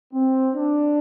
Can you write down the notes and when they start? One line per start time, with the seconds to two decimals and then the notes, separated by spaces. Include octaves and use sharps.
0.14 C4
0.54 D4